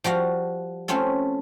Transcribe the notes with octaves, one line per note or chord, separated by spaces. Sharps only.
F3 G3 F#4 F5
A3 C4 C#4 F4 A4